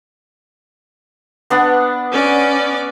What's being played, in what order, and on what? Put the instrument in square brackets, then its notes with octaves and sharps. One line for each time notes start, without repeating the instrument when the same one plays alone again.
[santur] B3 D4 F#5
[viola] C#4 D5